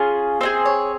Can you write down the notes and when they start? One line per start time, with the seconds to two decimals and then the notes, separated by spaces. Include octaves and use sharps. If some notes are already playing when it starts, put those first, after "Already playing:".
Already playing: C#4 F4 G#4
0.41 C4 D#4 G#4 C5
0.65 C#5